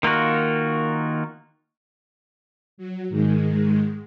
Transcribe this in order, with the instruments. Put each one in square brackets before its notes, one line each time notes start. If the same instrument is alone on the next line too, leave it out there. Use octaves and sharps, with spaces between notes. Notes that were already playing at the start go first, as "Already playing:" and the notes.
[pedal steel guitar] D#3 A#3 F4 F#4
[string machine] F#3
G#2 D#3 G#3